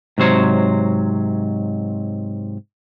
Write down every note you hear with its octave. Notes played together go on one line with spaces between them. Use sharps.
G#2 C3 F#3 C5 C#5